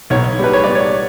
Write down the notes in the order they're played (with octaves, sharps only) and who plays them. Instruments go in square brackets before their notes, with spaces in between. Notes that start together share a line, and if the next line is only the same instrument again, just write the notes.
[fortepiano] B1 C#5
G3 B4
C#5
B3 D5
C#5